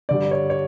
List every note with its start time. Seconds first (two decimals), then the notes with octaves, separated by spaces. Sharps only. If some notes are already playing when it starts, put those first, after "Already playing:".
0.09 G2 D3 G3 D5
0.31 C#5
0.50 C#5